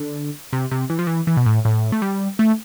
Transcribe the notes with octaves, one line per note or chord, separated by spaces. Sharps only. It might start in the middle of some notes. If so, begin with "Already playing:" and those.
Already playing: D3
C3
C3
E3
F3
E3
E3
B2
A2
A2
A3
G3
A3